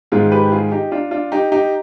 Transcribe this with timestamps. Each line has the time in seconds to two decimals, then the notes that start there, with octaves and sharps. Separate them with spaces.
0.12 G#2 D#3 G#3 F4 G#4
0.32 G4 B4
0.52 F4 G#4
0.72 D#4 G4
0.92 D4 F4
1.11 D4 F4
1.32 D#4 G4
1.52 D#4 G4